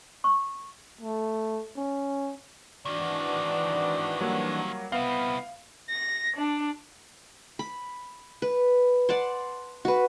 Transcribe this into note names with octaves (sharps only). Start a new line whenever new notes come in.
C#6
A3
C#4
D#3 E3 C4 D4 F#4 D5
F#3 G3 A#3
B3 C4 E4 F5
A#6
D4
B5
B4
D5 F#5 A5 C6
F#4 B4